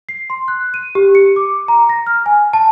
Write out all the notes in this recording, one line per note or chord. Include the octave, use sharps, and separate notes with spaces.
C7
C6
F#6
D#7
G4
C#7
D6
A#5
A#6
F6
G#5
A5